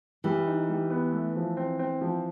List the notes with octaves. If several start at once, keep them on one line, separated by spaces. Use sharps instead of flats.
E3 G3
D#4
G3
B3
A3
F3
C4
C4
F3